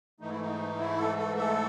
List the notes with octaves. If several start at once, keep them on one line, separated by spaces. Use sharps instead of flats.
G#2 E3 A3 D#4
E4
D#4
E4
A4
A4
A4